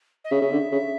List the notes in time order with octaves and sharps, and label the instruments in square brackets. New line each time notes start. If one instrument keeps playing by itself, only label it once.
[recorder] D#5
[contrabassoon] C#3 [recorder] E5
[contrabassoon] C#3
D3
C#3